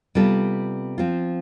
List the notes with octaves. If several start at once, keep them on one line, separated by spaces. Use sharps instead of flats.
C3 G3 B3 F4 A4
F3 C4 F4